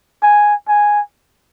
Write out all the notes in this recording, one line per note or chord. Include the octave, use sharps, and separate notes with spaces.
G#5
G#5